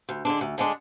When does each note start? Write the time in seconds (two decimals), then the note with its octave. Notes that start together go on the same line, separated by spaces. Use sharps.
0.09 D2
0.25 D3 G#3 D4
0.41 D2
0.58 D3 G#3 D4